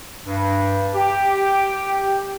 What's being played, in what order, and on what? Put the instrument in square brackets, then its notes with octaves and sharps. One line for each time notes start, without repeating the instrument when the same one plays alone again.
[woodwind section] G2
G4